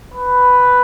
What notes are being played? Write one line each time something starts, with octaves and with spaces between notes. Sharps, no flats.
B4